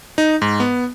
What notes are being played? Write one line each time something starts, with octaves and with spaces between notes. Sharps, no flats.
D#4
G#2
B3